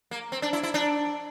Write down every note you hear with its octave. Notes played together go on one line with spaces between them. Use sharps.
A#3
C4
D4
E4
E4
D4